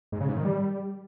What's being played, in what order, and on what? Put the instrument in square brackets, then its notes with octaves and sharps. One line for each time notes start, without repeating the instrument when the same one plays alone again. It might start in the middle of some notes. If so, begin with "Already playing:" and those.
[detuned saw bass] G#2
C#3
G#2
D#3
G3